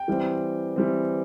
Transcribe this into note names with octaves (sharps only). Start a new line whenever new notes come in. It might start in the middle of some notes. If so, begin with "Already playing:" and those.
Already playing: G5
E3 G3 C4
E3 G3 C4